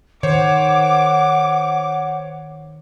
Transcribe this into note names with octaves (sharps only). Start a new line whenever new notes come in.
D#3 C5 C#5 F#5 D6